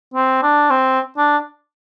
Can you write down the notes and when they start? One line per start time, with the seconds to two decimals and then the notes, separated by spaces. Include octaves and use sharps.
0.14 C4
0.43 D4
0.70 C4
1.18 D4